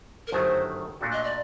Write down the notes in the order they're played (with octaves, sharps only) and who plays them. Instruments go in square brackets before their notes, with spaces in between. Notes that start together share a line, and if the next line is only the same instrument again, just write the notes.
[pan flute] A#4
[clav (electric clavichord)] G1 F#2 D#3 F#3 A3 [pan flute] C5
[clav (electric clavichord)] A#2 A3 D4 F#4
[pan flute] D#5
D5